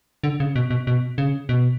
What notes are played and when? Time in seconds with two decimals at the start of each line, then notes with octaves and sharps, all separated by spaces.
0.24 D3
0.40 C#3
0.56 B2
0.71 B2
0.87 B2
1.18 C#3
1.49 B2